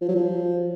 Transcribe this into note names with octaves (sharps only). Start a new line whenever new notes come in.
F3
F#3
F3